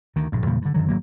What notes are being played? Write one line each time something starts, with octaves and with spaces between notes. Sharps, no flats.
D2 D#3
A#1 G2
E2 A#2 C#3 G3
G2 D3
F#2 D3 D#3 F#3
G#1 F#3 A#3